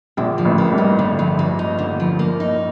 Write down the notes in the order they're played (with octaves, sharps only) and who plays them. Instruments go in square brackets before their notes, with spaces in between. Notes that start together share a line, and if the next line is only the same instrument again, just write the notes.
[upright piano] A#1 A#2 [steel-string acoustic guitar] D3
[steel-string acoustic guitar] F3
[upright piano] A1 A2
[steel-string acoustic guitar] A#3
[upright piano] G1 G2
[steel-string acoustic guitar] D#4
D3
F3
A#3
D#4
D3
F3
A#3
D#4